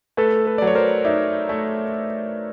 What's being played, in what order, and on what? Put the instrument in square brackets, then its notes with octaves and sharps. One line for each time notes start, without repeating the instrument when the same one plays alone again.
[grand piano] A3 [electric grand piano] A4 B4
[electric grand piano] A4 B4
D5
[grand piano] F#3
[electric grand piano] C#5
A#4 C5
[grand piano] D#4 [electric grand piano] D5 E5
[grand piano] A3